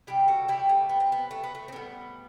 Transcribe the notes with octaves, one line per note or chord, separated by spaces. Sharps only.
C3 G3 E4 G4
F#4 A4
E4 G4
A3
B3
C4
B3
A3
B3
A3
C4
A2 G3 B3